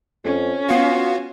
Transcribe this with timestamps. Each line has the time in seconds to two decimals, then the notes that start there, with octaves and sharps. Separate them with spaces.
0.24 F2 C#4
0.69 B3 F4 F#4 F5